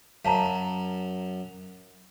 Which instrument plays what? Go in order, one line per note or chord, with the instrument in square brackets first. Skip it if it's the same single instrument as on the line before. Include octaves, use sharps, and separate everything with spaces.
[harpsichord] F#2 [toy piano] F5 A5 A#5